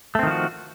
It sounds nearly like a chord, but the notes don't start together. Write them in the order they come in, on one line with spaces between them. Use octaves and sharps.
A3 C4 D#3 F3 F#4